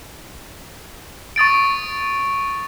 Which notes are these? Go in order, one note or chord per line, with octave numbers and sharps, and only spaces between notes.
C#6 D#6 A6 D7